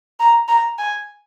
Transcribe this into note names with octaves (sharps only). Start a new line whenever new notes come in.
A#5
A#5
G#5